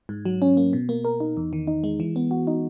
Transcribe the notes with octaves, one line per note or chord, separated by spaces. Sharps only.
G#2
F#3
C#4
A#3
B2
A#3
A#4
D#4
E2
D#3
D#4
G#3
E3
B3
F#4
D#4